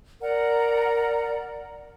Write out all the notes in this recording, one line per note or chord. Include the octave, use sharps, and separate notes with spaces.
A#4 D5 F#5 A#5